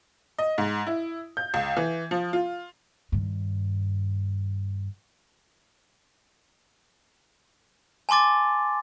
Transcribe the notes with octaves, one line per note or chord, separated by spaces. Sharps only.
D#5
G#2
E4
G6
C#2
E3
F3
F4
G2 D#3
G#5 A5 C6 D6 A6